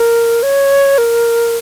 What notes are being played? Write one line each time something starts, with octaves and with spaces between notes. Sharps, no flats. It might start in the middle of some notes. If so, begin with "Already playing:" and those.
Already playing: A#4
C#5
A#4